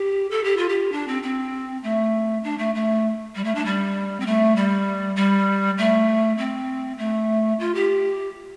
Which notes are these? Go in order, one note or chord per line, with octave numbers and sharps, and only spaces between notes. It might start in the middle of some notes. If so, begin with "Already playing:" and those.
Already playing: G4
A4
G4
F4
G4
D4
C4
C4
A3
D4
A3
A3
G3
A3
D4
G3
C4
A3
G3
G3
A3
C4
A3
F4
G4